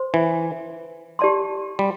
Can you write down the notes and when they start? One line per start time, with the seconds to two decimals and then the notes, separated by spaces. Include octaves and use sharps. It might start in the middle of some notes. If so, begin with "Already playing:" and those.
Already playing: C5 C6
0.14 E3
1.19 G4 D5 A5 C6
1.79 G3